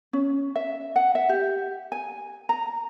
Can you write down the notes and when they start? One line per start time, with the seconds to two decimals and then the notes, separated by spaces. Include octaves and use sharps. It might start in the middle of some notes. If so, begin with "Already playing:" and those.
0.13 C#4
0.56 E5
0.96 F#5
1.15 E5
1.29 G4
1.92 G#5
2.49 A#5